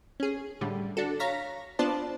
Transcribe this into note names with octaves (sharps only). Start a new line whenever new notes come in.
C#4 G#4
A2 D3 G3
D4 F#4 A4
C#5 F5 A#5 A#6 B6
B3 D4 F4 C5 D5 A5